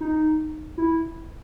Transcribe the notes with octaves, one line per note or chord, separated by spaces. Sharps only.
D#4
E4